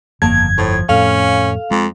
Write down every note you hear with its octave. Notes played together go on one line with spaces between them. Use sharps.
G1 F2 D#3 A#3 A5 G#6
A2 F3
F2 A2 C#4 A4 F5
F2 G#3